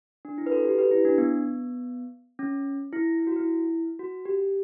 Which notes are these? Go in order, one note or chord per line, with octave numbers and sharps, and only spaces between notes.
D4
E4
B4
F#4 A4
G4 B4
G4 B4
E4
D4
B3
C#4
E4
E4
F#4
E4
F#4
G4